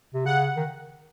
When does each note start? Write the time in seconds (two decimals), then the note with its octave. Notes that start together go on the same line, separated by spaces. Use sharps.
0.14 C3
0.26 C#3 F#5
0.57 D#3